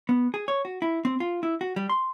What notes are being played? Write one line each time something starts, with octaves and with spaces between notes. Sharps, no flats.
B3
G#4
C#5
F#4
E4
C4
F4
E4
F#4
G3
C6